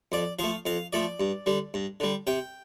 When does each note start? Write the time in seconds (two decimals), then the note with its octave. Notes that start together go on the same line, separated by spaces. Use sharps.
0.12 F2 D5
0.39 F3 A3 F5
0.66 F2 F5
0.93 F3 A3 D5
1.20 G2
1.46 D3 G3
1.74 G2
2.00 D3 G3
2.27 C3 G5